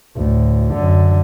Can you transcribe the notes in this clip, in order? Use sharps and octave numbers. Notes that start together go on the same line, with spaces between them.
D2 A2
F#2 D3